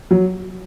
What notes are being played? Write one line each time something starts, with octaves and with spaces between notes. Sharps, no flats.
F#3